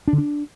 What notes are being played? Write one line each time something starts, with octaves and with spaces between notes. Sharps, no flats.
D4
D3
D4